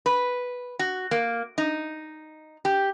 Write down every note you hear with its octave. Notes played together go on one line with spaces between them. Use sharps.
B4
F#4
A#3
D#4
G4